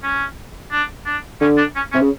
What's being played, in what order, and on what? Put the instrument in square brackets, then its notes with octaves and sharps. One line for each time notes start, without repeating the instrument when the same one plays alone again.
[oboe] C#4
D4
D4
[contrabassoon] D3 [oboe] C#4
[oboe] D4
C#4
[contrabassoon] C3 [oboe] C#4
[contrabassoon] C#3